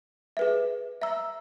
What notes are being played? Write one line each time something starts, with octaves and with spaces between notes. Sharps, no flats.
G#4 B4 E5
E5 A#5 E6